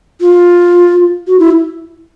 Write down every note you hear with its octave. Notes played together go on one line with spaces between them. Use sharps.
F4
F#4
E4